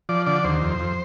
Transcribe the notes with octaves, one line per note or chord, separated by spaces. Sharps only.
F3 D5
D3 D5
D#2 C5
F2
F2